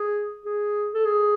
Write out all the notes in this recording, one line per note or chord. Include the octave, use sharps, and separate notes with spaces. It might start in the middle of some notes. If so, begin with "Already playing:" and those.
Already playing: G#4
G#4
A4
G#4